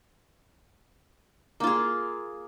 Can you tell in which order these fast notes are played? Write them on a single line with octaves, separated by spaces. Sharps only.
A#3 F4 G#4